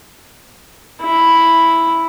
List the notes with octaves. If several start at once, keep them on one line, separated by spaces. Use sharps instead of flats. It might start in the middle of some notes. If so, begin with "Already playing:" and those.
E4